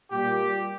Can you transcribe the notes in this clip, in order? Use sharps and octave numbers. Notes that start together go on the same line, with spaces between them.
A#2 G3 G4